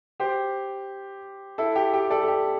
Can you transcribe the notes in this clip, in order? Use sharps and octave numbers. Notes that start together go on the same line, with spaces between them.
G4 C5
E4 A4
G4
G4
A4 D5
A4
G4